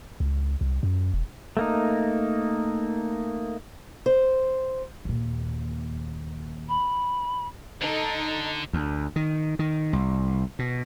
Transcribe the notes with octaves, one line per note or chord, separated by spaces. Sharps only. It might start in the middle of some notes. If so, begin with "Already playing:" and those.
C#2
C2
F#2
E1
A3 A#3 D#4
C5
D#2 A#2
B5
D3 D#4 A4
D2
D#3
D#3
C2
B2